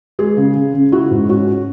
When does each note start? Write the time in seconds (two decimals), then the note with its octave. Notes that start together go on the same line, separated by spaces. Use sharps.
0.19 G#3 G#4
0.37 C#3
0.55 C#3
0.74 C#3
0.92 E4 F#4
1.11 G#2
1.29 C#4 F#4
1.47 C#4